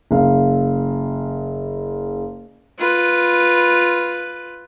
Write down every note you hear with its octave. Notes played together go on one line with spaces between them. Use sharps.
F#1 F5
F4 B4